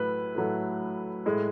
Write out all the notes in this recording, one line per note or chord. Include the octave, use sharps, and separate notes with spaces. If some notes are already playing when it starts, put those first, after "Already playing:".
Already playing: A2 F#3 A3 B4
A2 F#3 A3
A2 G#3